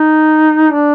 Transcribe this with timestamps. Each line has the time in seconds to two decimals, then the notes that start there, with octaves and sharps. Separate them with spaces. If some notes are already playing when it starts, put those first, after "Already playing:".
Already playing: D#4
0.72 D4